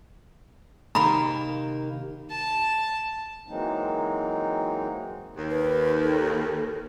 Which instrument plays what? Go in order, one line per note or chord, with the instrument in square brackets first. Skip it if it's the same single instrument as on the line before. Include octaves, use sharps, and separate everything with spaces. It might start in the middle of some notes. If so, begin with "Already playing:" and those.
[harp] C3 [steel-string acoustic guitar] D#3 A#3 [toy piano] A#5 B5
[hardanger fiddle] A5
[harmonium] E3 F#3 G#3 A#3 C4 D#4
[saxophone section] D#2
[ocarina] B4
A4